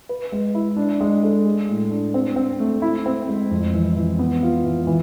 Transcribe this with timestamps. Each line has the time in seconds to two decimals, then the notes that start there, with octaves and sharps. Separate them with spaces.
0.09 B4
0.32 G#3
0.54 E4
0.77 D4
1.01 G#3
1.23 A4
1.45 G#4
1.69 A2
1.91 D4
2.14 C4
2.36 C4
2.60 A3
2.82 E4
3.06 C4
3.28 G#3
3.51 F2
3.74 E3
3.96 E3
4.19 B3
4.43 F4
4.64 E3
4.87 E3